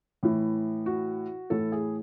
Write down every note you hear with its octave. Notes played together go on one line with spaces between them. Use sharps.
A2 E3
F#4
A2 E3 A4
G#4